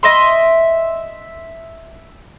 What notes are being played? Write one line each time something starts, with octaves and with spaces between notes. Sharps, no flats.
D#5 E5 C6